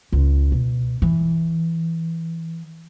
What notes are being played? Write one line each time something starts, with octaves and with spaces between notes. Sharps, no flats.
C#2
B2
E3